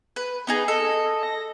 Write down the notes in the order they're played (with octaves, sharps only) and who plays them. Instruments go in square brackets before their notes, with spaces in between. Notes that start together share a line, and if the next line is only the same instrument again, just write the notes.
[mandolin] B4
B3 D#4 G#4
[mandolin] A4 [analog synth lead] D#5
[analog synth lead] A#6